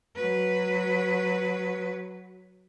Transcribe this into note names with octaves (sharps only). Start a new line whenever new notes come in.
F#3 B4